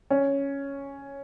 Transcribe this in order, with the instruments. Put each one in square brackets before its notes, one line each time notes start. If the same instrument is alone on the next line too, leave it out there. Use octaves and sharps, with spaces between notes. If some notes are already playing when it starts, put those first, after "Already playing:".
[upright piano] C#4